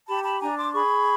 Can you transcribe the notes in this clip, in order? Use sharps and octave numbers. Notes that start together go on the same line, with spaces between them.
G4 A5 B5
A5 B5
D4 G#5 A#5
C6 D6
G#4 B5 C#6